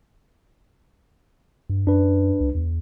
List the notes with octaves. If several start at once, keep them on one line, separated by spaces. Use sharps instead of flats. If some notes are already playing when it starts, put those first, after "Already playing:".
G2
F#2 D4 B4
C#2
E2